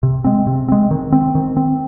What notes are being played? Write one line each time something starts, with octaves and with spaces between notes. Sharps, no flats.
C3
G#3 C4
C3
G#3 C4
D#3
C4
D#3
C4